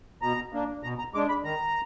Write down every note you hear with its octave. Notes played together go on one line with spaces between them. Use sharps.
B2 A#5
A#3 D4
B2 A#5
A#5
G#3 D4 D6
B5
D#3 A#5